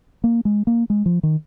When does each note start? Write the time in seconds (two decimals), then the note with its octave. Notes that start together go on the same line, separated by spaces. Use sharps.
0.24 A#3
0.45 G#3
0.67 A#3
0.90 G#3
1.06 F3
1.23 D#3